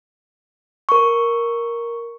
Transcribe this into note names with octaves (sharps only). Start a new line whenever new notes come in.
A#4 C#6